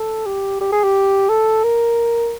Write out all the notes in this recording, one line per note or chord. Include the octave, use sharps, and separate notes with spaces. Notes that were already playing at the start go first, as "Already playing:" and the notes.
Already playing: A4
G4
G4
G#4
G4
A4
A#4